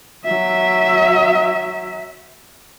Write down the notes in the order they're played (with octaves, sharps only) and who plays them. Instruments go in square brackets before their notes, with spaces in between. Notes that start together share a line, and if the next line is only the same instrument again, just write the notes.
[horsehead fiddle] F#3 E5